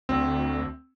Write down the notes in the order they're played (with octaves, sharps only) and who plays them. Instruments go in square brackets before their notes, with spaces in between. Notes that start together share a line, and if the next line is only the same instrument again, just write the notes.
[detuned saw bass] D2 [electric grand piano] C4